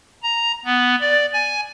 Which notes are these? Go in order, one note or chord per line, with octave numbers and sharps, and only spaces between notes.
A#5
B3
D5
G#5